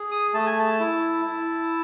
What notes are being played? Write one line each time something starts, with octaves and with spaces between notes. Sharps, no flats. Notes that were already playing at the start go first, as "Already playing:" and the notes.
Already playing: G#4
D#6
A3 A5
G#5
A5
E4
E4